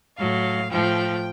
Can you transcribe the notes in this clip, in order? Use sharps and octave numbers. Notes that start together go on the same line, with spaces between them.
A2 F#3 F5
A2 F3 G5